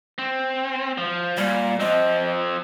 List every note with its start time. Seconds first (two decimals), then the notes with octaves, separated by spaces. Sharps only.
0.19 C4
0.98 F3
1.37 A#2 G3
1.80 F3 C4 D#5